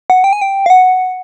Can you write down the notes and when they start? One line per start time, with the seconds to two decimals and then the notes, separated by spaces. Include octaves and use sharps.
0.10 F#5
0.24 G5
0.33 G#5
0.42 G5
0.66 F5
0.70 F#5